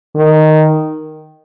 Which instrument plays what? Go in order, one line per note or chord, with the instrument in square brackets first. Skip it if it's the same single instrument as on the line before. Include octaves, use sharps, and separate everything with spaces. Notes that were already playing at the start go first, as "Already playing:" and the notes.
[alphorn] D#3